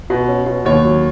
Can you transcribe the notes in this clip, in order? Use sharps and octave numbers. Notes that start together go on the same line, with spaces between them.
B2
C#4
B2
D#2 C#5
F#3